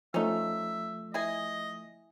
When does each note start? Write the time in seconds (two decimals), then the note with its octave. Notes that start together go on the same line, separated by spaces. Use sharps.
0.14 F3 A3 C#4 D#4 E5
1.14 E4 G#4 D#5 G#5